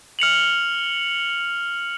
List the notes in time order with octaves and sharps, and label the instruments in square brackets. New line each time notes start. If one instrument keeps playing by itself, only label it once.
[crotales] F6 C#7 F7 F#7